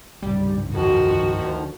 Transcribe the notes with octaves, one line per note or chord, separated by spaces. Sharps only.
C2 G2 C#3 G3
F2 D#3 F3 F#4
D2